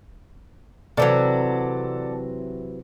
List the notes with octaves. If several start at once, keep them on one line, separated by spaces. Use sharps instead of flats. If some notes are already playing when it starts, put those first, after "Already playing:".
C3 E3 F#3 A4 D5 A5